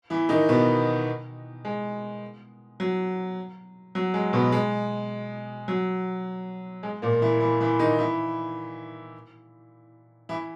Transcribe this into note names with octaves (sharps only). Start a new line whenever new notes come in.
E3 E4
D#3 D#4
B2 B3
G#3
F#3
F#3
G#3
B2 B3
G#3
F#3
G#3
A#2 A#3
E3 E4
E3 E4
E3 E4
D#3 D#4
E3 E4
E3 E4